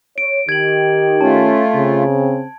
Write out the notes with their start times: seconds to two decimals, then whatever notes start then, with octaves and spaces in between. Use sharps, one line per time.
0.18 C#5 D7
0.49 D#3 G4 G#6 F#7
1.21 A3 C#4 F4 A5
1.75 C#3 C4